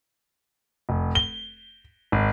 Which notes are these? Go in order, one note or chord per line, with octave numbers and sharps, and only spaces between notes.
F1
G7
G#1